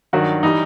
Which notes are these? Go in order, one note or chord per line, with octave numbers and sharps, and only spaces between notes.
G2 D#3 F#3 F#4
E3 G3 D#4